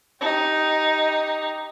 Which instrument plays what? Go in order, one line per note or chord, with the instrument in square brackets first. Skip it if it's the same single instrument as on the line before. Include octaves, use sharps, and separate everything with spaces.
[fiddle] D#4 G4